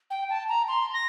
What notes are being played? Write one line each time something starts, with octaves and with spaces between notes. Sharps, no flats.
G5
A5
A#5
C6
A#6